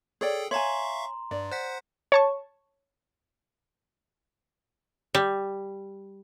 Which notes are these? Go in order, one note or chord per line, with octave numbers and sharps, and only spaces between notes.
G#4 A4 C#5 D5 G5
C#5 E5 F5 G#5 A#5 C6 C#6
G2 D5
C5 F#5 F#6 B6
C#5 A5 C#6
G3